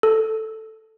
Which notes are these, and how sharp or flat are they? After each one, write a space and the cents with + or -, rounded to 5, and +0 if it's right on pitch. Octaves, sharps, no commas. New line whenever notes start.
A4 +5